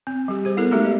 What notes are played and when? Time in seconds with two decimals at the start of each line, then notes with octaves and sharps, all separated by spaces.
0.07 C4
0.28 G3 G4
0.45 G#4 C5
0.57 B3 E4 A4 A#4
0.71 G#3 A3 D#4 F#4 G4 A4
0.85 D#5